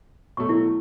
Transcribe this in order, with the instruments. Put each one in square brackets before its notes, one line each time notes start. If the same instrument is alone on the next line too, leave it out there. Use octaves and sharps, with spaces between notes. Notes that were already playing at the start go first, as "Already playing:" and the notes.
[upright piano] B2 F#3 A3 [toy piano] C#6
[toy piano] E4